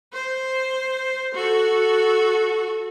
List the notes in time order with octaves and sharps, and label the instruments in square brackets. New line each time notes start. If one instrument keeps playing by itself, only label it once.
[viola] C5
F#4 A4